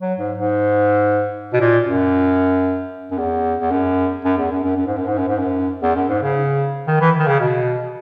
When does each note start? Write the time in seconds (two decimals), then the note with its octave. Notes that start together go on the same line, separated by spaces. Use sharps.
0.01 F#3
0.19 G#2
0.37 G#2
1.53 B2
1.60 A#2
1.86 F#2
3.11 F#2
3.18 E2
3.60 E2
3.71 F#2
4.24 F#2
4.37 E2
4.51 F#2
4.64 F#2
4.76 F#2
4.87 G#2
4.97 F#2
5.07 G#2
5.18 F#2
5.28 G#2
5.38 F#2
5.82 E2
5.95 F#2
6.09 G#2
6.22 C#3
6.87 D#3
7.00 E3
7.19 D#3
7.27 C#3
7.40 B2